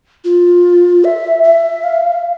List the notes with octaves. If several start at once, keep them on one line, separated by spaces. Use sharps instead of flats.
F4
E5
E5
F5